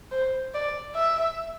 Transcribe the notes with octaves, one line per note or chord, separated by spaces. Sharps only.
C5
D5
E5